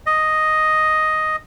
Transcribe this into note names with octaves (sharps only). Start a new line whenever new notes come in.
D#5